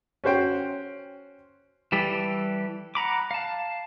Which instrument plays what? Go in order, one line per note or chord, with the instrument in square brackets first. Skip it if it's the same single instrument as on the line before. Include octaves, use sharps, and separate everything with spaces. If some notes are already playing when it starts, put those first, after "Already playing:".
[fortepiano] C#4 F#4 C5 G5
[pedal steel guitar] E3 G3 G4 A4
F#5 A#5 B5 D6
F5 A5